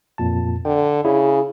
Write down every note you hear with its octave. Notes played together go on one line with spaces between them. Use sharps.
F2 A#2 A5
D3 G5
C#3 E4 G#4